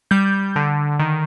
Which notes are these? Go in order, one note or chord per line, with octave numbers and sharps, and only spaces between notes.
G3 G6
D3
D#3